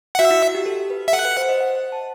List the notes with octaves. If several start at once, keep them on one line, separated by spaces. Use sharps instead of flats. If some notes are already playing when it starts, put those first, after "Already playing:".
F#5
F#4 E5
E4
F#4
G4
A4
B4
E5
A4 F#5
B4
C5
D#5
F#5
F#5
A5